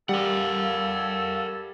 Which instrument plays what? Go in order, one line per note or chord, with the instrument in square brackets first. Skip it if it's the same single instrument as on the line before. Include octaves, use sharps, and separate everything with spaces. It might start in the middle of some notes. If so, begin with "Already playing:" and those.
[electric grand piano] G3 [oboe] A4 [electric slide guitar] A#4 F#5 [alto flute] F5